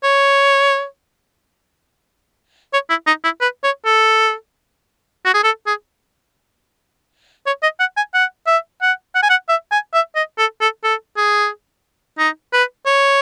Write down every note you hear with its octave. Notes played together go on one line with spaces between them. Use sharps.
C#5
C#5
E4
D#4
E4
B4
C#5
A4
F#4
G#4
A4
G#4
C#5
D#5
F#5
G#5
F#5
E5
F#5
F#5
G#5
F#5
E5
G#5
E5
D#5
A4
A4
A4
G#4
D#4
B4
C#5